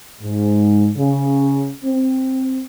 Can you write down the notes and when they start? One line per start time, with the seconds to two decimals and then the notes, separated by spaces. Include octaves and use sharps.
0.22 G#2
0.96 C#3
1.84 C4